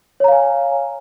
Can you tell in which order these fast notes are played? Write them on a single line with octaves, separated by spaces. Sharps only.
C#5 A#5 F5 G#5